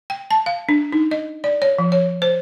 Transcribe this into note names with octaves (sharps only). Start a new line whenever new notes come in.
G5
A5
F5
D4
D#4
D#5
D5
C#5
F3
C#5
C5